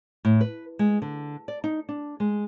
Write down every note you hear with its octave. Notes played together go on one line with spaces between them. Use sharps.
A2
B4
G#3
D3
D5
D#4
D4
G#3